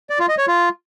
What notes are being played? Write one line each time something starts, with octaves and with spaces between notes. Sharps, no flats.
D5
F4
D#5
C#5
F4